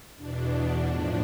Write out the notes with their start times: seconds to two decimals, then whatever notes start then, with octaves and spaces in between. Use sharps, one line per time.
0.16 E2 B2 D4
0.85 A2 F3